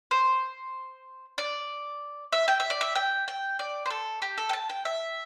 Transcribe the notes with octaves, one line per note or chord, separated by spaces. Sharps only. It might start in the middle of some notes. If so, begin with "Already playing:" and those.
C5
D5
E5
G5
E5
D5
E5
G5
G5
D5
C5
A4
G4
A4
G5
A5
G5
E5